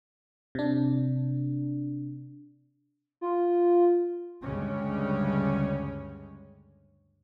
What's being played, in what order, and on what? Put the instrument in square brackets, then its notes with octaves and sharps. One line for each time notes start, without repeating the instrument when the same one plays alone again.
[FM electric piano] C3 D4
[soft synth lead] F4
[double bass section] D2 G2 C#3 G3 G#3 C#4